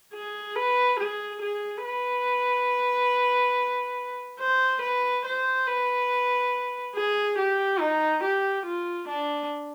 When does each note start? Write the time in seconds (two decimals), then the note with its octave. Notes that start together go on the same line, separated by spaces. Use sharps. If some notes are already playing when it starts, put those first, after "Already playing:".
0.14 G#4
0.56 B4
0.99 G#4
1.41 G#4
1.85 B4
4.39 C5
4.81 B4
5.25 C5
5.67 B4
6.95 G#4
7.38 G4
7.80 D#4
8.23 G4
8.66 F4
9.08 D4